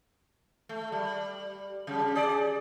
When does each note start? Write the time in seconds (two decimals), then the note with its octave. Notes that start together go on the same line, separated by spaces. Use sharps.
0.69 A3
0.92 G3
1.87 C#3 G3
2.15 G#4 D5